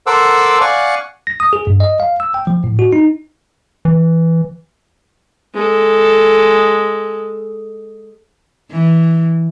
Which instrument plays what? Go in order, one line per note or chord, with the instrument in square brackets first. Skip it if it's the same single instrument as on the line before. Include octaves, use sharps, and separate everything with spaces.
[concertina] A4 A#4 C5 F#5 D6 E6
D5 F5 F#5 G#5 C#6
[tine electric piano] A#6
D#6
G#4
G2
D#5
F5
E6
G5
F3
A2
F#4
D#4
[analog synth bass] E3
[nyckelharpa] G#3 A4
[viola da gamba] E3